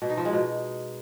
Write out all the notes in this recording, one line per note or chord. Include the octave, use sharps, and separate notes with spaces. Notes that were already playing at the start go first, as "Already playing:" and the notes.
B2
D#4
F3
G#3
B2